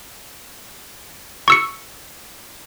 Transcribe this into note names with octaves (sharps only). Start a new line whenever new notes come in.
C#6 E6 C#7